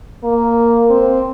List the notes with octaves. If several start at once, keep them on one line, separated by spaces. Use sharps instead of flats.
A#3
C4